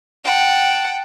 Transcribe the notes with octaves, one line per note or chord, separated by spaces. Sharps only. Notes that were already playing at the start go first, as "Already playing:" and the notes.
F#5 G5 A5